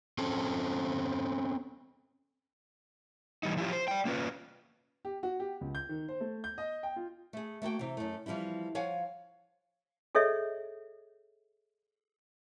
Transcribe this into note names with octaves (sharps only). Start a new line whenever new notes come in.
C4 C#4 A4 C5
E3 G3 D#4
F3 E4 F4 G4
C5
D5 G5
A#3 C#4 F4 B4
G4
F#4
G4
C#2
G6
D#3
C5
A3
G6
D#5
G5
F4
A3 G#4
A3 A#3 F#4 G5
C3 E3
F#2 A3
E3 F3 G3 C4 E4
F3 C#5 F5 F#5 G#5
G#4 A4 C#5 D#5 E5